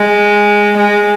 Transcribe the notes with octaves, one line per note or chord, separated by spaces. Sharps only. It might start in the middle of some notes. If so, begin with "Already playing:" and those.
Already playing: G#3
G#3